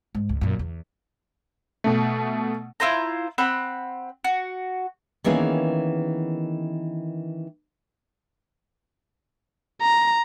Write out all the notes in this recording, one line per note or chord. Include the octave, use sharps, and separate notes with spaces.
G#2
C#2
F#2 A#2
E2
B2 A3
E4 F4 C5 A#5
C4 F#5 B5
F#4
D#3 E3 A#3 B3 C#4 G#4
A#5